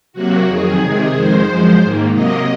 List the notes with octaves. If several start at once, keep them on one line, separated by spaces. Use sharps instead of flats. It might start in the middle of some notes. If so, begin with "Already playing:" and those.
C3 F#3 A#3 F#4
F2 D#3 F#3 G#4
C3 D#3 G#3
F2 D#3 G#3 C5
F#2 F3 G#3
G#2 D#3 A#3
C3 F#3 A#3 D#5